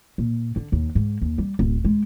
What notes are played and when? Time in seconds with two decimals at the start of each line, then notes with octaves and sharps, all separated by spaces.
0.18 A#2
0.56 D3
0.72 D#2
0.95 G#2
1.21 D#2
1.38 G3
1.59 D1
1.85 G#3